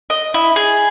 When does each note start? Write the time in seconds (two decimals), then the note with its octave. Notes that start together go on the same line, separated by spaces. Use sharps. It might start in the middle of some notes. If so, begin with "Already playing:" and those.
0.10 D#5
0.34 E4
0.56 G#4